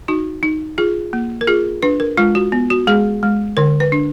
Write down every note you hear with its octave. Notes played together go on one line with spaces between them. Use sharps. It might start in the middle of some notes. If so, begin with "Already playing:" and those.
D#4 F#4
D#4
F4 G#4
A#3
A#4
F4 G#4
D4 B4
A#4
G#3 F4
F#4
B3
F#4
G#3 G#4
G#3
D3 A#4
B4
D4